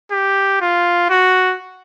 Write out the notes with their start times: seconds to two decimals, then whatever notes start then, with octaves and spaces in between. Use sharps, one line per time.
0.11 G4
0.61 F4
1.10 F#4